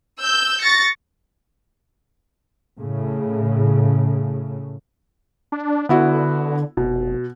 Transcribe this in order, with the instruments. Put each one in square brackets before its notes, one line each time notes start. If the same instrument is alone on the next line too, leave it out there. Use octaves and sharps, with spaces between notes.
[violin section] E6 G6
C#6 A6 A#6 C#7
[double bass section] A2 C#3
[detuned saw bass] D4
[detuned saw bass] D3 [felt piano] B3 E4 F#4
[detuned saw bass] F1 [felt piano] B2